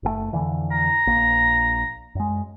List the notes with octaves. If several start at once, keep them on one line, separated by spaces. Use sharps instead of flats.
F#1 A2 A3
F2 D3 E3
A#5
A#1 A#3
F#2 G#3